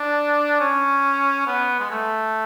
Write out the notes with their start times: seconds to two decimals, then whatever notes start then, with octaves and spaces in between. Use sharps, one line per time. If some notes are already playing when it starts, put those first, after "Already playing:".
Already playing: D4
0.60 C#4
1.47 B3
1.80 G#3
1.91 A3